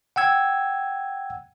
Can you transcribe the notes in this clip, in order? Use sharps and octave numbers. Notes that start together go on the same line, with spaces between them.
F#5 G5 E6 G#6